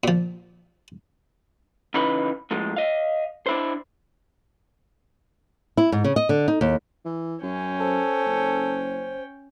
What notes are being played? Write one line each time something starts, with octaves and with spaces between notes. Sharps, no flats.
A#2 F3
C#3 E3 D#4 B4 B5
A2 F3 G#3
D#5 F5
D4 E4 C5
E4
G#2
C#3
D#5
D3
D#4
D#2
E3
F#2 C#4 G5
A4 C5
F#1